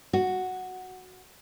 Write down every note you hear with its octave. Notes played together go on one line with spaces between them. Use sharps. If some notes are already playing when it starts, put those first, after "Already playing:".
F#4